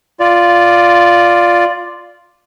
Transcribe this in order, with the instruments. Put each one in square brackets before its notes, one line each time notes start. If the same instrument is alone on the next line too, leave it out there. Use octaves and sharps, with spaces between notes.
[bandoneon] F4 D5